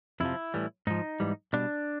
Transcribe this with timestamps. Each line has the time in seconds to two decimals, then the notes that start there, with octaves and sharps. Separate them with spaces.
0.20 F2 C3 F3 E4
0.54 A2 E3 G3
0.87 G#2 F3 D#4
1.20 G#2 E3 G3
1.53 B2 G3 D4